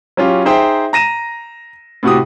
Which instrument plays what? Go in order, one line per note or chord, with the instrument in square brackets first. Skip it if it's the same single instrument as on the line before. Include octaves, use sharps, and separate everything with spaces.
[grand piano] F#3 C#4 F4 G4
D#4 G#4 C5 E5 G5
A#5 A#6 D#7 E7
A2 C3 F#4 G4 D#6